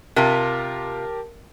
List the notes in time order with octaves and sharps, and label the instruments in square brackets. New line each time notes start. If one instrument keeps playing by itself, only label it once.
[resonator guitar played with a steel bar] C3 F4 [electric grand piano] G4 A#4 A5